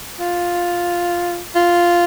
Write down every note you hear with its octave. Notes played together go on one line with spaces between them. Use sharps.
F4
F4